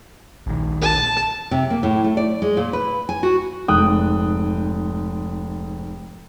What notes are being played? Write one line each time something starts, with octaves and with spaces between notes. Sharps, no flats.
A#1 D#3
A5
C3
A#3
A2
A3
D5
G#3
A#2
B4
G#5
F#4
F1 G#2 G5 D#6 F#6